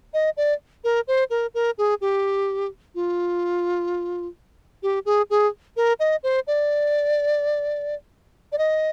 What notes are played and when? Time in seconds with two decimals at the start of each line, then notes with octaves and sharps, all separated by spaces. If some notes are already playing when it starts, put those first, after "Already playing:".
0.13 D#5
0.37 D5
0.84 A#4
1.07 C5
1.30 A#4
1.54 A#4
1.78 G#4
2.01 G4
2.95 F4
4.83 G4
5.05 G#4
5.30 G#4
5.76 A#4
5.99 D#5
6.23 C5
6.47 D5
8.52 D5
8.58 D#5